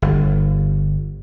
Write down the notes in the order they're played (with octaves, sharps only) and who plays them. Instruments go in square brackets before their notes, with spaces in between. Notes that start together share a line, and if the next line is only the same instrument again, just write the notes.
[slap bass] G1